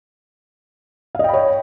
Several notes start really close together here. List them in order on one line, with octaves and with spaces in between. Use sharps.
F5 D#5 G5 B5 C#5